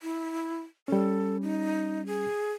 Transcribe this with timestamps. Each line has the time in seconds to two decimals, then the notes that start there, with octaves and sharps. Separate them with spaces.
0.02 E4
0.88 G3 C#4 A4
1.42 D#4
2.06 G#4